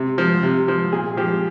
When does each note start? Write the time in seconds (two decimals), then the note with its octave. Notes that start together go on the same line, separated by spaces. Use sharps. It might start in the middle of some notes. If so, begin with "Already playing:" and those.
Already playing: C3
0.18 F3
0.43 C3
0.68 F3
0.93 A#2 G#4
1.17 F3 G4